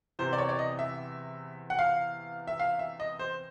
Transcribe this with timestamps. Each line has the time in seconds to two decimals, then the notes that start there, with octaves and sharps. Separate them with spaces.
0.19 E2 C3 E3 C5
0.33 D5
0.38 C#5
0.49 D5
0.59 D#5
0.79 E5
1.70 F#5
1.79 F5
2.47 E5
2.60 F5
2.79 E5
3.00 D#5
3.19 C5